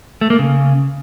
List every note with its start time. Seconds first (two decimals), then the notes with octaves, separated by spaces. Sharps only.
0.21 A3
0.30 A#3
0.39 C#3